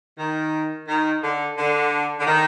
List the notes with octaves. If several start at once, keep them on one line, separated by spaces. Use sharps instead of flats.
D#3
D#3
D3
D3
D3
D#3